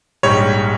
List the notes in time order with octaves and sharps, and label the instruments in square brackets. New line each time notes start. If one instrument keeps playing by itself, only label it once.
[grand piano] A#1 G#2 G3 C#5